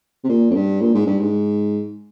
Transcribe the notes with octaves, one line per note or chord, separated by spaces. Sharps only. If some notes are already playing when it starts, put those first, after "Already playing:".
C3
A#2
F2
G2
A#2
G#2
G2
G#2